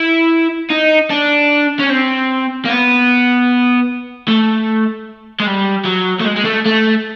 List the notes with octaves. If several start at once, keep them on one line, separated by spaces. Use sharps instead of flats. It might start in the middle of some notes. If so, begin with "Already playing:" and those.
Already playing: E4
D#4
D4
C#4
C4
A#3
B3
A3
G#3
G3
F#3
A3
G#3
G#3
A3
A3